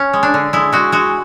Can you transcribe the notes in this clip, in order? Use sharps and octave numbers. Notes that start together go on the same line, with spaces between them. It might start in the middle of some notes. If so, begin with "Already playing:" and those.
Already playing: C#4
G#3
D4
D3
G#3 E4
G#3 F#4
G#3 F#4